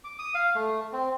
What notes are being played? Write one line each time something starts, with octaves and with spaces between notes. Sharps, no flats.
D6
D#6
F5
A3
C4